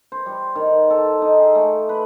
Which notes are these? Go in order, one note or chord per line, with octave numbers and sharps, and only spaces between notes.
C5
G3
D#3
A4
D#4
G#4
A3
B4